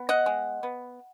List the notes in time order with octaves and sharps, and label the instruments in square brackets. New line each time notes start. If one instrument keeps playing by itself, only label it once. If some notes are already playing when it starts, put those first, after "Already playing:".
Already playing: [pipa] B3
D#5 F#5
G#3
B3